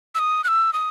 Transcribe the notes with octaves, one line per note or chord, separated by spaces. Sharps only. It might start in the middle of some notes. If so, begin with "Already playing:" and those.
E6
D#6
F#6
E6
D#6